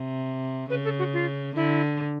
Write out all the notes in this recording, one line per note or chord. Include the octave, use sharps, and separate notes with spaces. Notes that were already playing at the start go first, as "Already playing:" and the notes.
Already playing: C3
C#3 B4
A4
F#4
F4
D3 E4